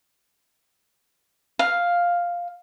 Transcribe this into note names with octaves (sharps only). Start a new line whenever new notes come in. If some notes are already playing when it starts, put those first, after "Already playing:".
F5